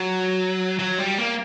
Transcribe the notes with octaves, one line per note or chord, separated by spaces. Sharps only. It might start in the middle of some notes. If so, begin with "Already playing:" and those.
Already playing: F#3
F#3
G3
A#3